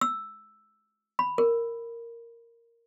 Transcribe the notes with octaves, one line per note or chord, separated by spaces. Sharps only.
E6
B5
A#4